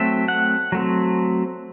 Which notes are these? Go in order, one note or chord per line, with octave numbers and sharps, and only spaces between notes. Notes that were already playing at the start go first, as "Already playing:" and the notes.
Already playing: F#3 A3 C4 E5
F#5
F#3 A3 C4